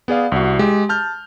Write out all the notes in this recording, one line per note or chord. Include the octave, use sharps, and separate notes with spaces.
B3 G#4 D5 F5
C2 F#4
G#3 G4
A5 F6 G6